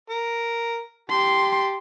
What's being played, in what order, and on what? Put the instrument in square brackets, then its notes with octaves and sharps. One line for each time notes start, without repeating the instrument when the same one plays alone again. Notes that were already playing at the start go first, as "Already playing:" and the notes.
[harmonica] A#4
[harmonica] G4 A5 [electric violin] C6